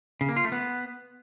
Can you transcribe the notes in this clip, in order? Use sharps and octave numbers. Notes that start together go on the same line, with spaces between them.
C#3
A#3
F4
A3
B3